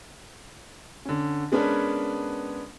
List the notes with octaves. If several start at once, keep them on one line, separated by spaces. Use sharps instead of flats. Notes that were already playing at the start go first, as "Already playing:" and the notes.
D3 C#4
G#3 B3 C#4 D4 A#4 B4